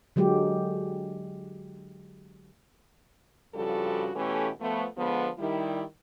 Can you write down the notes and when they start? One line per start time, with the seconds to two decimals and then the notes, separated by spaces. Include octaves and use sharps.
0.16 D3 F#3 G#3 G4
3.55 G2 C#3 F3 G3 F#4 A4
4.15 B2 E3 A3 C#4 G4 A4
4.61 F3 A3 B3
4.97 D3 F3 G#3 B3
5.39 D#3 G3 E4